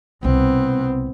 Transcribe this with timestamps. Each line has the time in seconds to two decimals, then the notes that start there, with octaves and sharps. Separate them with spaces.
0.23 C2 B2 B3 C4